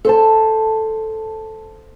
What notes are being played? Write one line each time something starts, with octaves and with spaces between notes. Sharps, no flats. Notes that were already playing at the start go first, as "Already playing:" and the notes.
A4 C5 A5